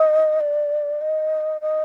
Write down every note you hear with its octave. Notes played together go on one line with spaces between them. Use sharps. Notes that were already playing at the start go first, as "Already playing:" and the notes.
Already playing: D#5
D5
D#5
D#5